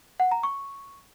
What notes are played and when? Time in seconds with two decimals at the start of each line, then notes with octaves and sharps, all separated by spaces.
0.20 F#5
0.31 A#5
0.43 C#6